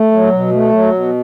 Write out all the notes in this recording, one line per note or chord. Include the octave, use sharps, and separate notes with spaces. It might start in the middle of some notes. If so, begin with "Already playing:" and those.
Already playing: A3
F#3
B2
A3
F#3
B2